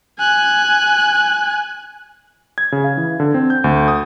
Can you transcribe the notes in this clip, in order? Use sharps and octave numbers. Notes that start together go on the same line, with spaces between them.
G#5 F#6
G#6
C#3
F5
E3
D3
C4
G6
D2
D#6